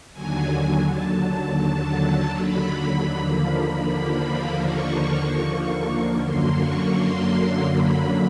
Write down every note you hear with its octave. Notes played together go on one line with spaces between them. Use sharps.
D#2 D3 F#3 G#5
A5
B5
D#2 D3 F3 A#3
C#6
F#2 D3 F#3 A#3 C6
C#6
C6
B5